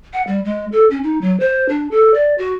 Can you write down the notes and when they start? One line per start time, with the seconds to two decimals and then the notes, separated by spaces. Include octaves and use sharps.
0.13 F#5
0.27 G3
0.45 G#3
0.72 A4
0.90 C#4
1.04 D#4
1.22 F#3
1.40 C5
1.69 D4
1.91 A4
2.14 D5
2.38 F#4